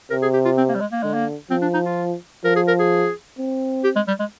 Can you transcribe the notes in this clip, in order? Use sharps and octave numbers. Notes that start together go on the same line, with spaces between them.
C3 A#4
G#4
G4
F4
C4
A#3
G3
G#3
A#3
D3 G#3
A#3
F3 C4
D4
D#4
F4
F3 A#4
G#4
A#4
G#4
C4
G4
G#3
G3
G#3